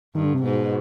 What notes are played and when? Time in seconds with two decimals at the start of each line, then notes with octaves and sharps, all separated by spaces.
0.15 G2 D#3
0.24 D3
0.34 C3
0.44 G#2 B2